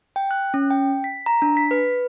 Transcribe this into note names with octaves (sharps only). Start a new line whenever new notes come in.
G5
F#6
C#4
G5
B6
A#5
D4
B6
B4